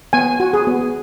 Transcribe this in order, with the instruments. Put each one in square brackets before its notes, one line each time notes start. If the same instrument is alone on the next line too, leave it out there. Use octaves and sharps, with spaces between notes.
[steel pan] B3 G#5
F#4
G#4
B3